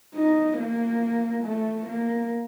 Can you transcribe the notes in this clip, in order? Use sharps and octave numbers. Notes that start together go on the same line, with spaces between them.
D#4
A#3
A3
A#3